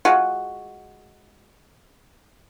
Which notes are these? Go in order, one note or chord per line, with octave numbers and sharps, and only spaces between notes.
G#3 F4 F#4